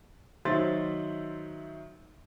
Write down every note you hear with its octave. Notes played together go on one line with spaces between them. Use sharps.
D#3 F#3 C5 E5 C6 A6